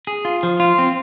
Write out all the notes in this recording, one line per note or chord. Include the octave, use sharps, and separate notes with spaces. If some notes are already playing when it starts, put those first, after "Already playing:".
G#4
F4
F3
F4
C4